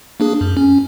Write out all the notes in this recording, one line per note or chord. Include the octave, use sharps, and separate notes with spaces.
A#3 D4 G#4
F#2
C#4